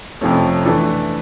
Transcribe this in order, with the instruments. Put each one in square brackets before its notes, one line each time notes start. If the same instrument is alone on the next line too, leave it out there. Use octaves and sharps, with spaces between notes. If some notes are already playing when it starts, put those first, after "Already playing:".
[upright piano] F2 C3 F3 A3 C#4
E3 A3 D4